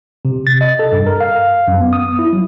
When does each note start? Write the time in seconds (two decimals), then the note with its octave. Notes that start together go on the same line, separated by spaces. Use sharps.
0.25 C3
0.47 A6
0.61 D#5
0.79 A4
0.92 G2
1.07 A#4
1.21 F5
1.68 F#2
1.80 B3
1.93 D#6
2.19 E4
2.33 F#3